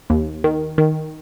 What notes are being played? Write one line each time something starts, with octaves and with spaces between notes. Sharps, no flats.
D#2
D#3
D#3